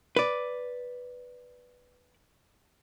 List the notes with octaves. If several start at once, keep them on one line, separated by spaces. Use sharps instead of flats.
B4 D5